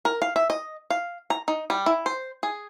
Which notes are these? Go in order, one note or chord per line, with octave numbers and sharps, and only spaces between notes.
A#4
F5
E5
D#5
F5
A#5
D#4
G3
E4
C5
G#4